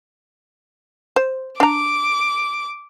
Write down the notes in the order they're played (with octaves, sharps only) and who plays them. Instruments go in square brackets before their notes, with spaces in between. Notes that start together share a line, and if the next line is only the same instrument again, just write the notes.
[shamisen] C5
[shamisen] D4 A#5 [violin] D6